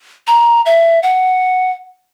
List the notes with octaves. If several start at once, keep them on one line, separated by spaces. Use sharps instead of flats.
A#5
E5
F#5